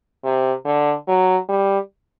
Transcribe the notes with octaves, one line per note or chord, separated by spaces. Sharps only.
C3
D3
F#3
G3